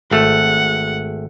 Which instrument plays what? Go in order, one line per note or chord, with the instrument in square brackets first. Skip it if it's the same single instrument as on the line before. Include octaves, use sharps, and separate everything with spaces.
[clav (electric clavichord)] G#1 A3 [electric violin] F#5